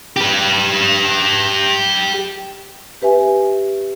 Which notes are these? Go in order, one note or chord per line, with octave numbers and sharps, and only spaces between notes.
G4 B4
G4 B4 E5 G#5